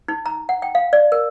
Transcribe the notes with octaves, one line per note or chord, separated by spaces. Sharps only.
D#4
A#5
F#5
G5
F5
D5
A#4